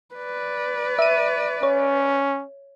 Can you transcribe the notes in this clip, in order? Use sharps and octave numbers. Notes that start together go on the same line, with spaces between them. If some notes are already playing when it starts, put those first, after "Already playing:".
B4 D5
E5 D#7
C#4 C#5